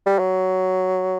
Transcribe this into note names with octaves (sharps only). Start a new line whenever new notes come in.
G3
F#3